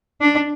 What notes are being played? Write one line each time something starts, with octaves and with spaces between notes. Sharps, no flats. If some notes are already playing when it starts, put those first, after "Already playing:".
D4